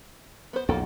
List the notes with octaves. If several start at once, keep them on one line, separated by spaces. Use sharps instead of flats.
B3 C5
B1 F2 A#3 F4 A4